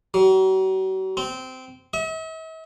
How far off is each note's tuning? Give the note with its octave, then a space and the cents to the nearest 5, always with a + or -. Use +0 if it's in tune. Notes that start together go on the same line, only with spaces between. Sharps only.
F#3 +40
C4 -15
E5 -45